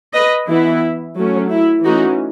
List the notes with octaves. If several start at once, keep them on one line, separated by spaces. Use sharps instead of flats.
B4 D#5
E3 B3 E4
F#3 A3 C#4
E4
E3 A3 C#4 D#4 F#4